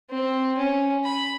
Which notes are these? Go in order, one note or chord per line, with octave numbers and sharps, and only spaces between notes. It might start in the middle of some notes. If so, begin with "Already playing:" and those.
C4
C#4
B5